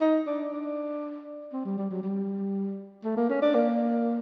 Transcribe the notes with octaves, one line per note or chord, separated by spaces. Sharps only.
D#4
D4
D4
C4
G3
G3
F#3
G3
A3
A#3
C#4
D4
A#3